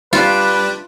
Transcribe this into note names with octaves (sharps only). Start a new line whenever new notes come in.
G3 D4 F4 B4